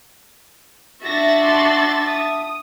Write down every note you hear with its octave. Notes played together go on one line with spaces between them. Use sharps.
D4 F#4 E5 A6 A#6
A5 C6
D#6